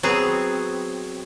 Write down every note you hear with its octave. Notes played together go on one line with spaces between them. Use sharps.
F#3 B3 C4 G#4